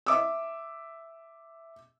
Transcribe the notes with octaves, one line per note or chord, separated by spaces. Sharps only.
E5 D6 E6